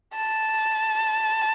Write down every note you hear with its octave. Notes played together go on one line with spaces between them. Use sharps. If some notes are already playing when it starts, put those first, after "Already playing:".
A5